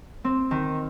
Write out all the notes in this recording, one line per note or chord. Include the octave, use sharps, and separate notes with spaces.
C4
D#3